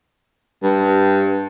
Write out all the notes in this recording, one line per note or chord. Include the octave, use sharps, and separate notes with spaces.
G2